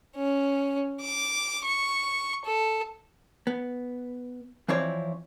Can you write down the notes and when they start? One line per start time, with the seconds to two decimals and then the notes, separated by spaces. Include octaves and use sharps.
0.17 C#4
1.01 D6
1.65 C#6
2.45 A4
3.47 B3
4.68 E3 F3 C4 E4 C#5 D5